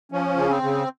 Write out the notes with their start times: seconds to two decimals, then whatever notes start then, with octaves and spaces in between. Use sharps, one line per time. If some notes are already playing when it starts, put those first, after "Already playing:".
0.12 F3 C#4
0.37 C#3
0.49 C4
0.62 C#3